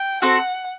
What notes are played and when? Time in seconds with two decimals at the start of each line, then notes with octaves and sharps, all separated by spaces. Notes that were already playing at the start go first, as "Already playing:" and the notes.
Already playing: G5
0.22 C4 F#4 A4 F#5